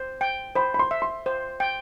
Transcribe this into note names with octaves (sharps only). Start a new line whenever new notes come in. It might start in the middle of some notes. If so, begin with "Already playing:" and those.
Already playing: C5
G5
C5 B5
B5
C6
E5
C6
C5
G5